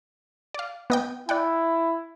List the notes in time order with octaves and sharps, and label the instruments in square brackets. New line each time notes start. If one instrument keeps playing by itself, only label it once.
[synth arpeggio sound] D5 F5
B3 D#5 G5
[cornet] E4 [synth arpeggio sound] D5 F#5 G5